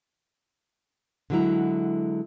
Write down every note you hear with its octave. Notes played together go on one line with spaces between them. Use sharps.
D3 E3 F#3 G#3 E4 A#5